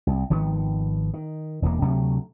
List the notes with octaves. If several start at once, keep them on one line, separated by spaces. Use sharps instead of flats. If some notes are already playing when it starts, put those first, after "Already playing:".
C2
G#1 D#3 F3 B3
D#3
E1 E2 E3 A#3
D2 C3 F#3 A3